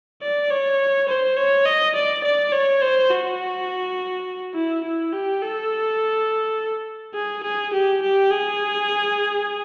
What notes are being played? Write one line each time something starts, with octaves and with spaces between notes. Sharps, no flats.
D5
C#5
C5
C#5
D#5
D5
D5
C#5
C5
F#4
E4
E4
G4
A4
G#4
G#4
G4
G4
G#4